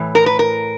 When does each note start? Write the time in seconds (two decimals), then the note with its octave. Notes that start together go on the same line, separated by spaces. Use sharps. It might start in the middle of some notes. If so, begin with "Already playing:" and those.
Already playing: A2 E3
0.15 A#4
0.26 B4
0.39 A#4